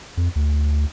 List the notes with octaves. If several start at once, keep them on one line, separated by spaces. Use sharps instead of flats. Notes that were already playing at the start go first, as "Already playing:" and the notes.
F2
D2